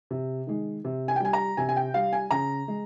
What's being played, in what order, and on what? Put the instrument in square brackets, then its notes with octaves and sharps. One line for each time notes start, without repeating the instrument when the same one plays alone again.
[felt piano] C3
D#3 G#3
C3
G#5
G5
G3 G#5
A#5
C3 G#5
G#5
G5
G3 F5
G#5
C#3 A#5
G#3